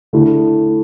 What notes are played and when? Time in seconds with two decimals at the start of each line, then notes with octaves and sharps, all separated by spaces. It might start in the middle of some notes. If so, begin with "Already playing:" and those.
0.13 D3 A3 E4